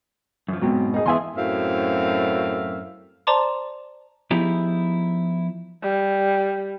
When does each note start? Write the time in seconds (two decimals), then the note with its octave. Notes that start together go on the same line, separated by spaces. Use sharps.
0.48 F#2 F3
0.61 G#2 B2 F#3 B3 C4
0.94 D#4 G#4
1.06 E2 E3 G#4 E5 G#5 C6
1.36 F#2 A2 F#3 C4 E5 F5
3.27 C5 D5 A5 A#5 C6 D6
4.31 F3 B3 D#4 E4 G4 G#4
5.82 G3